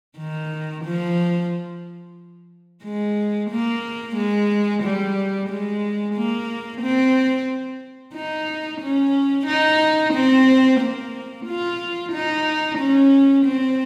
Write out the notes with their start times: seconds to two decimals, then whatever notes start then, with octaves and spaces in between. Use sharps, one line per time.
0.18 D#3
0.84 F3
2.84 G#3
3.50 A#3
4.16 G#3
4.83 G3
5.49 G#3
6.15 A#3
6.82 C4
8.14 D#4
8.81 C#4
9.47 D#4
10.14 C4
10.80 A#3
11.46 F4
12.13 D#4
12.78 C#4
13.46 C4